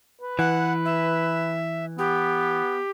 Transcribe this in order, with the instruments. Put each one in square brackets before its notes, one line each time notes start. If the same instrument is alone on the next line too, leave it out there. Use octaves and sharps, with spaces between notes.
[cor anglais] B4
[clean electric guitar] E3 [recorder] F#5
[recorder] E5
[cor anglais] B3 [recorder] G4